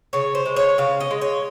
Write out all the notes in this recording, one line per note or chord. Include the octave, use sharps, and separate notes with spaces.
C#3 C#5
C5
G#3
C#5
C#3 F5
D#5
G#3
C#5